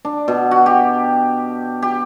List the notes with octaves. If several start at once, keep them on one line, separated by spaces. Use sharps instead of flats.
D4
B2
F#4
G4
G4